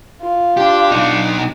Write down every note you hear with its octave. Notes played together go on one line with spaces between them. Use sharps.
F4
D4 G4
B1 D#4